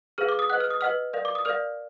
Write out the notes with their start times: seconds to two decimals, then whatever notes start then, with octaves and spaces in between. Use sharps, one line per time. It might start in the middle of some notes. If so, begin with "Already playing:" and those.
0.18 G#4 B4 F5 F6
0.29 D6
0.39 D#6
0.50 B4 D#5 F#5 F#6
0.60 F6
0.70 D#6
0.81 B4 D#5 F#5 F6
1.13 A#4 D5 F5
1.25 D6
1.35 D#6
1.45 A#4 D5 F5 F6